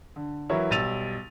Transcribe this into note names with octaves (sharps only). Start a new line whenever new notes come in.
D3
E3 F#3 E4 A#4 C#5
B1 G3 E6 A6 D#7 F7